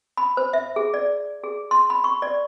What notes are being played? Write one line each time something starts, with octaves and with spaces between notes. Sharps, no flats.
B5
C5
E5
G#4
D5
G#4
C6
B5
C#6
D5